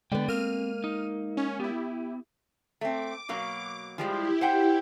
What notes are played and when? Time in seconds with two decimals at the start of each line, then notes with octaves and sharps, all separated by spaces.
0.12 D3 G#3 B3 D5 G5
0.28 A#3 C4 F6 D#7
0.84 D#4
1.37 C#4
1.60 B3 E4 G4
2.81 A3 C4 D6
3.29 B2 F#3 A#3
3.98 F3 G3 G#3 E4 G4
4.41 C5 F#5 G5